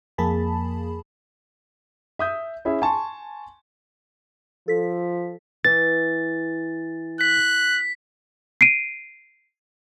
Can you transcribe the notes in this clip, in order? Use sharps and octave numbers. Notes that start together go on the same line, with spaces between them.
F2 A#3 G#4 A5 B5
E5 D#6 G6
C#4 E4 G#4 E5
G#5 A5 C6 C#6
F3 A4 B6
E3 A6
F#6 B6
C7 D7 D#7